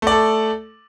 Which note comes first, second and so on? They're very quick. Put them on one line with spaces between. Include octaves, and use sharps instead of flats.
A3 D5 A4